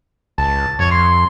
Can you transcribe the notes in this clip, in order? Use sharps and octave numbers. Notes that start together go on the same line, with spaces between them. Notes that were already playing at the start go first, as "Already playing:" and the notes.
C#2 A5
F2 C#5
C6